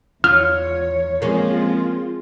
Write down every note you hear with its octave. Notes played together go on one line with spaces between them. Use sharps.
E2 F4 C#5 F6
F3 G#3 A#3 C4 C#4 F4